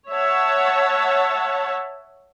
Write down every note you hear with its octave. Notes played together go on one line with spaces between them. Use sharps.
C#5 E5 F#5 A5